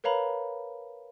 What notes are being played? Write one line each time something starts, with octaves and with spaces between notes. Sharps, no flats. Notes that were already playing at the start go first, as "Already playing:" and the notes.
A#4 B4 C#5 F5 A#5 B5